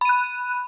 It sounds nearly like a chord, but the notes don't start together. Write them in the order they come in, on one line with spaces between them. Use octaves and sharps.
B5 D#7 F#6